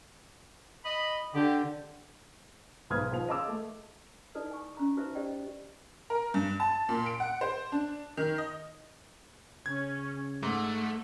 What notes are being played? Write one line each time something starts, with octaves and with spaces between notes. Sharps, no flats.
D#5 B5
D3 G4
B1 G#2 B4 D#6 F6 G#6
F3 F7
G#4 D#5 F5 A5 D6 E6
A3
D#4 E4 A4 B4 D5 D#5
G#5 C#6
C#4 A#5 C#6
D#4 F#4 B4 C5 E5
G4 C5 D5 D#5 G5
A#4
G2
A5
A#2
D7
F#5
C5
D4
D#3
D#5
C#3 C#4 G#6
G#2 A3 F#5